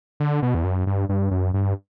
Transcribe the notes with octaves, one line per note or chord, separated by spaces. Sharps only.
D3
B2
E2
F#2
G2
G2
F#2
G2